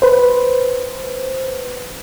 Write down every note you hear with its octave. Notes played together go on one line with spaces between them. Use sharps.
B4 C5